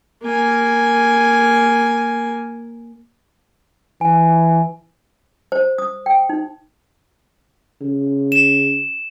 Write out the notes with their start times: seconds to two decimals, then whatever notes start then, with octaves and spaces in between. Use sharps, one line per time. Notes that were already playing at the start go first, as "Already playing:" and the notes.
0.23 A#3 G#5
4.01 E3 G#5
5.52 C5
5.78 D#6
6.06 G5
6.29 D#4
7.81 C#3
8.32 E7